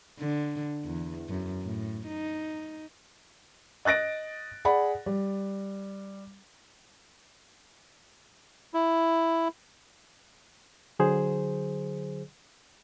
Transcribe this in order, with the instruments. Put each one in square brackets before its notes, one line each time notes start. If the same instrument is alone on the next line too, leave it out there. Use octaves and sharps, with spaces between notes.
[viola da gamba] D3
E2
F#2
A2
D#4
[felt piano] D#5 F#6 A6 A#6 D7
G#4 D5 F#5 B5
G3
[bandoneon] E4
[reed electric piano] D3 F#3 G#4 C5